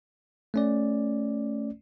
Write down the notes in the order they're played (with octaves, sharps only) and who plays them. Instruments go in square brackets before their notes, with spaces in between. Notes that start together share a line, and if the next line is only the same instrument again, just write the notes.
[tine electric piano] A3 C#4 D5